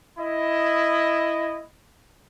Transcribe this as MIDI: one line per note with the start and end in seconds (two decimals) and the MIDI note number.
0.19 1.62 64
0.19 1.62 75